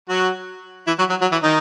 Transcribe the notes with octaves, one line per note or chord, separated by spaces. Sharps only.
F#3 F#4
E3 E4
F#3 F#4
F#3 F#4
F#3 F#4
E3 E4
D#3 D#4